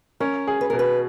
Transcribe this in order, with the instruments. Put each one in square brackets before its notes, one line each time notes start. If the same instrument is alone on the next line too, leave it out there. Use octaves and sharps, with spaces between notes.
[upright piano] C#4 [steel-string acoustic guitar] A#4
[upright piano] G#4
[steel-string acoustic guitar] B4
[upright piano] B2 [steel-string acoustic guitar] A#4
[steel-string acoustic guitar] B4